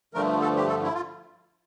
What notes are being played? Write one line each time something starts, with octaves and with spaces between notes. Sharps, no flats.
G2 D3 F3 A3 A#4
A4
G4
A4
E4
F4